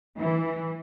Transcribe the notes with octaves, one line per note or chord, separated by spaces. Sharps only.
E3